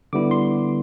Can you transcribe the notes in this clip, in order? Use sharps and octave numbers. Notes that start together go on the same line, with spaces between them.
D3 G3 B3 E4 D6
C6